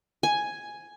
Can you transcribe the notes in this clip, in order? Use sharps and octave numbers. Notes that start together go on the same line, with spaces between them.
G#5